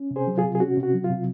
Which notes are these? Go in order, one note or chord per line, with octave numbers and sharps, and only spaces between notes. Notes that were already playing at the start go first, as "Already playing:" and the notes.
Already playing: C#4
C3
G#4 C5
F#3
F4 G#4
C3
G#4
C#4 F#4
C3
F#4
F#3
F4
C3